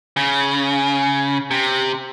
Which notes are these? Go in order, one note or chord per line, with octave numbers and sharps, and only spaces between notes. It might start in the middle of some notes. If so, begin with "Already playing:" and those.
C#3
C3